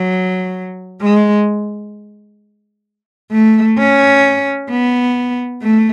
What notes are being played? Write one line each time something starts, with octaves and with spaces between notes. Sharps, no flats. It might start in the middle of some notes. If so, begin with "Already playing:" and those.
Already playing: F#3
G#3
A3
C#4
B3
A3